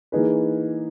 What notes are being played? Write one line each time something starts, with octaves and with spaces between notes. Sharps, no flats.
E3 A#3 D#4 G#4 B4